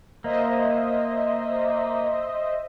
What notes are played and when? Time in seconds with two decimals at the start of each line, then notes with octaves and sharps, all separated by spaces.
0.24 A#3 C5 D#5 E5